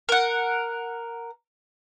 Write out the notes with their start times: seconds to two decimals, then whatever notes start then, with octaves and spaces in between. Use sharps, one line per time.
0.09 A#4 F#5